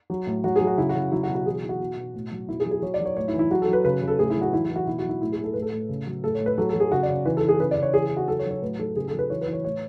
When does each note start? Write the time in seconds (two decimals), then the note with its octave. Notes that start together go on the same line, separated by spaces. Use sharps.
0.10 F#3
0.27 A2
0.44 F#3 F#4
0.56 G#4
0.61 F#3
0.67 F#4
0.78 C#3 E4
0.89 F#4
0.95 C#3
1.12 F#3 E4
1.23 F#4
1.29 B2
1.35 F#4
1.46 E3 G#4
1.63 E3
1.69 F#4
1.80 B2
1.97 B2
2.14 A2
2.31 F#3
2.49 B2 E4
2.60 G#4
2.65 F#3
2.71 G#4
2.82 F#3 C#5
2.94 D5
3.00 F#3
3.05 C#5
3.17 A2 C#5
3.28 E4
3.34 E3
3.39 E4
3.51 F#3 F#4
3.62 A4
3.68 F#3 B4
3.85 C#3 B4
4.02 C#3
4.08 A4
4.19 A2 G#4
4.30 E4
4.36 F#3
4.42 F#4
4.53 E3 E4
4.64 F#4
4.70 E3
4.76 F#4
4.87 B2 E4
4.99 F#4
5.04 F#3
5.09 E4
5.21 A2 E4
5.32 G#4
5.38 A2
5.44 A4
5.53 A2 B4
5.62 A4
5.73 A2
5.89 C#3
6.06 F#3
6.24 A2 A4
6.35 C#5
6.40 A2
6.46 B4
6.57 F#3 A4
6.69 A4
6.75 F#3
6.80 G#4
6.92 C#3 F#4
7.03 D5
7.08 C#3
7.25 E3 B4
7.37 A4
7.42 E3
7.49 G#4
7.59 C#3 B4
7.71 D5
7.77 C#3
7.83 C#5
7.94 E3 G#4
8.11 C#3
8.17 F#4
8.28 F#3 A4
8.39 C#5
8.45 F#3
8.51 C#5
8.62 A2 B4
8.79 F#3 A4
8.96 C#3 G#4
9.08 A4
9.13 F#3
9.19 B4
9.30 E3 C#5
9.41 B4
9.47 E3
9.53 C#5
9.64 A2 C#5